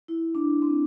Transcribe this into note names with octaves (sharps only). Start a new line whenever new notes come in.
E4
D4
C4